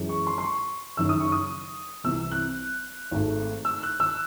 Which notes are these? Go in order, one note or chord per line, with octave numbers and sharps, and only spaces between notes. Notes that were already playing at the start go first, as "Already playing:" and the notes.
Already playing: F#2 E3 G#3
C#6
C6
C6
C#6
F#1 F#2 D#3 E6
D#6
C#6
D#6
C2 C3 E3 E6
F#6
G#1 G#2 D#3 A3
E6
F#6
E6